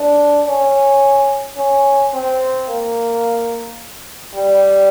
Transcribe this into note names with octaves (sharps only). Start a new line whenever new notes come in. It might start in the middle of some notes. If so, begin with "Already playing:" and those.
Already playing: D4
C#4
C#4
C4
A#3
G3